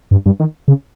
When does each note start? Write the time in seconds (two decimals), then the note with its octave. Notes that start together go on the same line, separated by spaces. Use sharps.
0.11 G2
0.26 G2
0.40 D#3
0.68 C#3